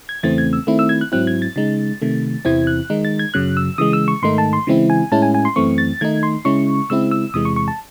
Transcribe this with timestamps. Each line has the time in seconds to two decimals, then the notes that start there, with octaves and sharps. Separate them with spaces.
0.09 G#6
0.23 E2 C#3 E3 A3 C4 A6
0.38 G#6
0.53 E6
0.67 D#3 A3 C4 E4
0.79 E6
0.89 G#6
1.01 F#6
1.12 G#2 F#3 C4 E4 F#6
1.27 G#6
1.42 A6
1.56 C#3 G#3 D#4
2.01 C3 D#3 A3
2.45 E2 C3 E3 C4 E4 G#6
2.67 F#6
2.90 D#3 G#3 D#4
3.05 A6
3.19 G#6
3.34 F#2 C#3 F#3 F#6
3.57 E6
3.78 C#3 E3 G#3 D#6
3.93 E6
4.08 C#6
4.22 G#2 D#3 A3 D#4 C6
4.38 A5
4.53 C6
4.67 C#3 E3 G#3 C4 E4
4.90 G#5
5.12 A2 G#3 C#4 E4 A5
5.22 G#5
5.34 G#5
5.45 C6
5.56 F#2 E3 A3 C4 C#6
5.78 A6
6.01 D#3 A3 D#4 G#6
6.23 C6
6.45 C#3 G#3 C#4 E4 C#6
6.90 C#3 G#3 C4 E4 E6
7.11 E6
7.34 E2 C3 E3 G#3 D#6
7.45 C#6
7.56 C#6
7.68 A5